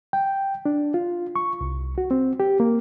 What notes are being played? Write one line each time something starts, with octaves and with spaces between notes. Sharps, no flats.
G5
D4
F4
C#6
C2
F#4
C4
G4
A#3